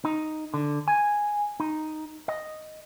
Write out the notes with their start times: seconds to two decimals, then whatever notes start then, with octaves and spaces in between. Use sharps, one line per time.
0.05 D#4
0.54 D3
0.88 G#5
1.60 D#4
2.28 D#5